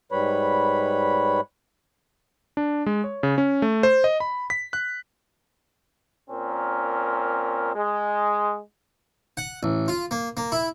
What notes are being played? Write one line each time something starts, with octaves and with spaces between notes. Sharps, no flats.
G#2 G3 B4 C#5 B5
D4
G#3
C#5
C#3
C#4
A3
C5
D#5
B5
B6
F#6
A#2 C4 C#4 A#4
G#3
F#5
A1
F4
A#3
A#3
E4